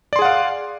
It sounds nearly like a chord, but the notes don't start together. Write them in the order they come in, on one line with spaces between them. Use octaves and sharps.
D5 C6 G#4 F#5 F5